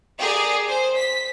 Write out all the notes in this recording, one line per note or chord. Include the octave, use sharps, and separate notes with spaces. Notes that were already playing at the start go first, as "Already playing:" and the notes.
G4 G#4 A#4 D5
C5
B6